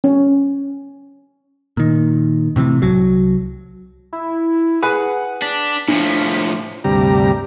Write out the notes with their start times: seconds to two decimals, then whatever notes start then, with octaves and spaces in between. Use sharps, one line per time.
0.04 C#4
1.77 A#2 D#3
2.56 A2 C3 D#3 E3
2.82 C2 F#3
4.13 E4
4.83 G#4 B4 F#5
5.42 D4 B6
5.88 A2 F3 D4
6.84 D2 G2 C3 G3 G4 A#5